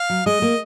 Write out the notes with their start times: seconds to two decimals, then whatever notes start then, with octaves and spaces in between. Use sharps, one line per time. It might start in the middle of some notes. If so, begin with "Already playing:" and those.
Already playing: F5
0.10 F#3
0.26 G#3 D#5
0.42 A#3